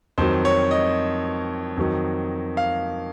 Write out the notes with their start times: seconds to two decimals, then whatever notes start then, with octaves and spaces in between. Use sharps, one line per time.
0.18 F2 D#3 F#3 C5
0.45 C#5
0.71 D#5
1.77 F2 D#3 F#3
2.57 F5